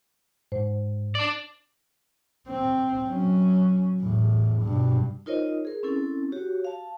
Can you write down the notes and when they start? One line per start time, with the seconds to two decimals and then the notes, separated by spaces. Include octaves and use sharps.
0.52 G#2 C5
1.15 D4 D5
2.48 C4
3.08 F#3 C#4
4.01 E2 A2
4.63 G2 B2
5.26 D#4 F4 A#4 C5 C#5 D#5
5.65 G#4 A#4
5.83 C4 C#4 E4 A4
6.32 F#4 G4 C#5
6.65 F5 A5